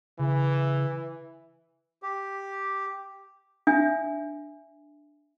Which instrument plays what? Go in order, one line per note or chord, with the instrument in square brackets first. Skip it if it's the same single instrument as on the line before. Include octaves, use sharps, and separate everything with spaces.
[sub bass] C#3 [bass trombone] E3
[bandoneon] G4
[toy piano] D4 E5 G#5